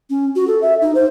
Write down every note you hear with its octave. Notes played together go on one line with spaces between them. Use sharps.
C#4
F#4
A4
E5
D#4
C5